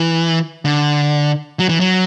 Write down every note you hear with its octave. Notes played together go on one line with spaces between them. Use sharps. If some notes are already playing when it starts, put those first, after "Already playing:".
Already playing: E3
D3
F#3
E3
F#3